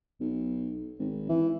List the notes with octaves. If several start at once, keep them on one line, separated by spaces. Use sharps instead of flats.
B1
G#1
E3